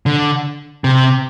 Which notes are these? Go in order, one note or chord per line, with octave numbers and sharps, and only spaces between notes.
D3
C3